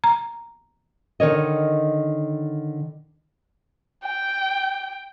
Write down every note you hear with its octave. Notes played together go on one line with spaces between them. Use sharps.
A#5
D3 D#3 A#4 C#5 D#5
G5